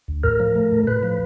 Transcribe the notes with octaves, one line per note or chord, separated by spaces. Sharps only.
D2
A2 A#4
F3
A3
A2
A2 B4
F3